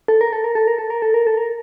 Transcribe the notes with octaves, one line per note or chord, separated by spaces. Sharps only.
A4
A#4
A4
A#4
A4
A#4
A4
A#4
A4
A#4
A4
A#4